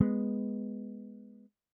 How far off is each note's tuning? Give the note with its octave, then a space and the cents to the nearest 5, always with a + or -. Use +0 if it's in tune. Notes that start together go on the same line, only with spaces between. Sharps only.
G#3 +0 B3 +0